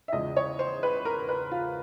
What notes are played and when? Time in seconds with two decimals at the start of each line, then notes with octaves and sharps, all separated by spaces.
0.08 E5
0.13 E2 C#3 F3 G#3 D#5
0.37 C#5
0.59 C5
0.83 B4
1.05 A#4
1.29 B4
1.52 F4